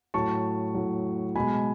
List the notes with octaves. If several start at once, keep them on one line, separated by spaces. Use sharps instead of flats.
A2 F#3 A5 C#6
A2 F#3
B2 G#3 G#5 B5